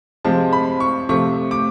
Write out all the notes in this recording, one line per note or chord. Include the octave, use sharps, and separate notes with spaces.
C3 F3 G#3 C4 A5
B5
C#6
C3 F3 A3 C#6
D6